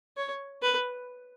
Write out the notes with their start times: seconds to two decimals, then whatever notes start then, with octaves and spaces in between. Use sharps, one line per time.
0.17 C#5
0.62 B4